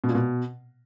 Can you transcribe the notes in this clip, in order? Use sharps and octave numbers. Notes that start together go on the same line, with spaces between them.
B2
A#2
B2